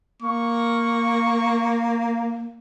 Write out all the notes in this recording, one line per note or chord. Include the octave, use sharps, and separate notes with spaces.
A#3 C#6